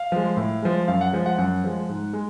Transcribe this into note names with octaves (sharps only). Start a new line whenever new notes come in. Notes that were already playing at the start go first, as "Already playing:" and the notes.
Already playing: F5
F3 G#3
A2
F3 G#3
F#2 F5
F#5
F3 G#3
F#5
F#2 F#5
F3 G#3
G#2
G#3